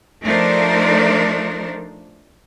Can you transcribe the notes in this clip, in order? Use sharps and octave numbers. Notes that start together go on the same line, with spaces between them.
F3 A3 D4 D#4 A#4 C5